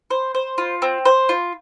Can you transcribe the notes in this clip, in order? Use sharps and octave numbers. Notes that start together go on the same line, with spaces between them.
C5
C5
F4
C4
C5
F4